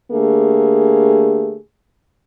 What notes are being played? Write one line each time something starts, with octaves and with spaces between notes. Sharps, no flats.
D3 A3 A#3 G4 G#4